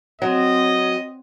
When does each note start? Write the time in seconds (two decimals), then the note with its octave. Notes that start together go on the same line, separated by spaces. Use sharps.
0.22 F#3 C4 D#5